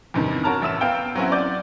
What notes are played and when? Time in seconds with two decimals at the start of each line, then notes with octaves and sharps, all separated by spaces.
0.14 E2 G2 C3 D#3
0.44 F#4 A#4 C#5 A5 A#5 F6
0.62 A1 E5 E6 E7
0.81 B3 F5 G5 G7
1.15 F#3 C4 C#4 E4 F#4
1.32 D5 D6 G6